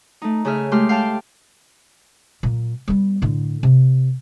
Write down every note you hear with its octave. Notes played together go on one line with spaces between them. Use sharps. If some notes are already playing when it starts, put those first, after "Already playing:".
A3 D#4
C#3 A3 G#4 E5 F6
G#3 A3 G4 C6 F6
F5 G5 A5 F6
A#2 F#3
G3 B3
A2 D3
C3